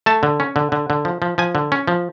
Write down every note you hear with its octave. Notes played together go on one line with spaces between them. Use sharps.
A3 A5
D3
C#4
D3
D3
D3
F3
F3
F3 G#5
D3
C#4
F3